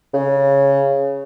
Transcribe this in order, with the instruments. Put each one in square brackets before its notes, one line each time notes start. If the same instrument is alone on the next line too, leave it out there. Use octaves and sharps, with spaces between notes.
[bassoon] C#3